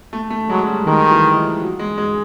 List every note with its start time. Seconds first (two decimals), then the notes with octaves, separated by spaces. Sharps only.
0.13 A3
0.30 A3
0.49 F#3 G#3
0.67 G3
0.86 D#3 G#3
1.11 E3
1.36 F3
1.60 F#3
1.79 G#3
1.98 G#3